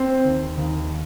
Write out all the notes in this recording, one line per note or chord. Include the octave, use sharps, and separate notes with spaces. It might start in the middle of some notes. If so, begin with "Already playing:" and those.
Already playing: C4 C5
D#2
D#2